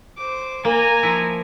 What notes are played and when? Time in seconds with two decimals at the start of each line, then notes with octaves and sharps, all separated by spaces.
0.17 C5 D6
0.65 A#3 G#5 A#5
1.03 F3 E4